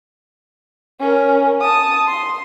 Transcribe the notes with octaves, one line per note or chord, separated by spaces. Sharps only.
C#4 A#4
A5 D#6
C6